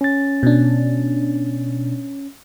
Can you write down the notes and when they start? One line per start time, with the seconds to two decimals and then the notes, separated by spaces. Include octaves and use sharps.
0.01 C#4 A6
0.43 B2 D4